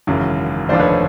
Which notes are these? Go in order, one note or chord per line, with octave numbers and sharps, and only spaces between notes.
G#1 F#2 C#3 E3
F1 D#2 D3 F3 C5 D5
B4 C#5